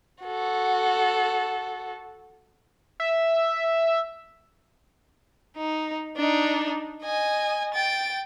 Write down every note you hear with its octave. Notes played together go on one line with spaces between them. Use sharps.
F#4 A4
E5
D#4
D4 D#4
D#5 G#5
G5 A6